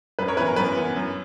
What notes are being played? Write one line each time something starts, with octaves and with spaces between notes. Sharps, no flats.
F#2 B4
A#4 C#5
E3 B3 B4
A#4
F#2 B4
E3 B3
F#2